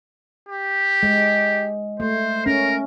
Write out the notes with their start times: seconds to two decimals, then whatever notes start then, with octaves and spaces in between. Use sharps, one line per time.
0.49 G4
1.03 G#3
2.00 A3 C5
2.46 C#4 A#4